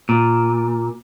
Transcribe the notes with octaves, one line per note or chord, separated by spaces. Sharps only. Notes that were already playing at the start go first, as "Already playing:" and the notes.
A#2